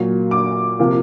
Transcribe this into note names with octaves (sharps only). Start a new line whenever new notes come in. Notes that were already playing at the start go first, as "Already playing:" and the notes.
Already playing: A#2 F#3 A#3
D6
C3 F3 A#3